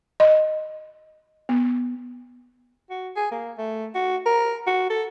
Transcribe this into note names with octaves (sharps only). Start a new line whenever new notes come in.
D#5
B3
F#4
G#4
A#3
A3
F#4
A#4
F#4
A4